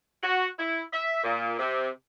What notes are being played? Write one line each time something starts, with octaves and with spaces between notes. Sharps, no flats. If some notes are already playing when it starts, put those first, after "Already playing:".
F#4
E4
E5
A#2
C3